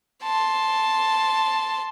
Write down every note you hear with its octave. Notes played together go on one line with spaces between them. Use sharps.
A5 C6